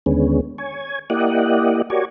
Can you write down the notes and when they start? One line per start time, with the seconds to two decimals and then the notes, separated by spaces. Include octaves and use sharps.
0.06 D#2 D3 G#3 B3 C#4
0.58 C#5 G#5
1.10 A#3 E4 G4 D5 D#5 F#5
1.90 F#4 G4 A#4 C#5 D5 G#5